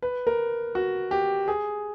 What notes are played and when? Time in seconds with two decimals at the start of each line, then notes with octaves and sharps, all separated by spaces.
0.02 B4
0.27 A#4
0.75 F#4
1.11 G4
1.48 G#4